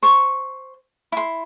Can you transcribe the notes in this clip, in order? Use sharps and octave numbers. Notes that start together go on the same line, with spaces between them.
C5 C#6
E4 C6